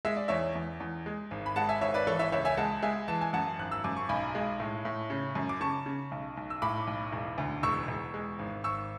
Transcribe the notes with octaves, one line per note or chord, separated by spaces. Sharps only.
G#3 E5
D5
E2 C#5 E5
E2
E2
G#3
G#1
B5
G#3 F#5 A5
E5 G#5
G#1 C#5 E5
B4 D5
E3 A4 C#5
C#5 E5
C#2 C#5 E5
E5 G#5
G#3 F#5 A5
G#3 E5 G#5
E3 A5
G#5
F#2 F#5 A5
G#1 F#6
E6
F#2 D6
C#6
B1 G#5 B5
G#3
A2
A2
C#3
F#2
D6
C#3 A5 C#6
C#3
B1
B1
E6
A2 B5 D6
B1
E1
D2
E1 C#6 E6
E1
G#3
G#1
G#1 C#6 E6